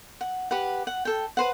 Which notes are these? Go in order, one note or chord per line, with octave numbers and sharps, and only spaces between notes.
F#5
G4 B4 F#5
F#5
A4 G5
B4 C5 F#5